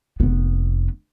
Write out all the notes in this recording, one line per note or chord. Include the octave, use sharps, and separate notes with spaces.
F1 B3